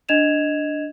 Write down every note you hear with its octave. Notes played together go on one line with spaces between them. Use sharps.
D4 D#5 G#6 E7 F7